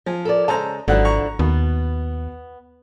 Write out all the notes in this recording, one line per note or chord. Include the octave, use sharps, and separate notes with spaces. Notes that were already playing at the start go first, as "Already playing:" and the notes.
F3 G#5
A4 A#4 D5
C#3 G#3 A4 C5 A#5
G#1 D3 F3 F#3 E4 F#5
A#5 C#6
D#2 B2 B3